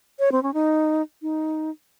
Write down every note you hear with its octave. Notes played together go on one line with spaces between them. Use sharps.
C#5
C4
C#4
D#4
D#4